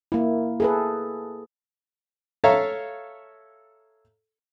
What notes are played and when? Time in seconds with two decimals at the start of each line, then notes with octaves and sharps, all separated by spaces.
0.12 A#3 E4
0.60 G#4 A4 B4
2.44 A4 C#5 E5 F5 A#5